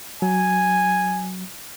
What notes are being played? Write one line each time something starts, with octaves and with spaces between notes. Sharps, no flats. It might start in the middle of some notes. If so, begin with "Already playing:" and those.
F#3 G#5